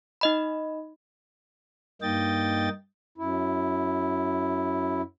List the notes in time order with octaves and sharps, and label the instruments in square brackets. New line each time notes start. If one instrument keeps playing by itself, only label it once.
[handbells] D#4 D#5 B5
[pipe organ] G2 A#3 D#4 D#5 G5 A6
[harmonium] F#2 E4